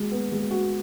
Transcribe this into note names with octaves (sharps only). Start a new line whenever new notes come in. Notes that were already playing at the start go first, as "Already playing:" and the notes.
Already playing: G#3 F#4
B3
G#3
F#4